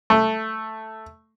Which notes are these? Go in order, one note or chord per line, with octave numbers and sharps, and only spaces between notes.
A3